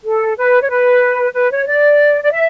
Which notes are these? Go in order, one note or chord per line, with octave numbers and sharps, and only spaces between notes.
A4
B4
C#5
B4
B4
C#5
D5
D5
E5